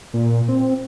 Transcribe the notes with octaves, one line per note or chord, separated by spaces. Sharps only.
A#2
C4